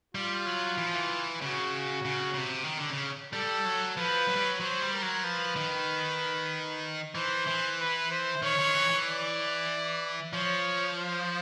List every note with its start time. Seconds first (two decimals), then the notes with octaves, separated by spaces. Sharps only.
0.14 G3 F4
0.46 F#3
0.78 E3
0.86 F3
0.94 E3
1.42 C#3 F#4
2.05 C#3
2.34 C#3
2.37 C3
2.64 D#3
2.77 D3
2.90 C#3
3.33 G3 A4
3.65 F#3
3.97 F3 B4
4.28 F#3
4.36 G3
4.44 F#3
4.60 F#3 C5
4.82 G3
4.92 A#4
5.03 F#3
5.24 F3 B4
5.56 D#3
7.15 E3 C5
7.47 E3
7.79 B4
8.11 C5
8.42 D#3 C#5
8.59 D#3
8.75 E3
8.90 E3
9.06 D5
10.33 F3 C#5
10.97 C5